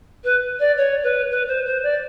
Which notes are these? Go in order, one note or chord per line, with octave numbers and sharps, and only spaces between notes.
B4
D5
C#5
B4
B4
C5
C5
D5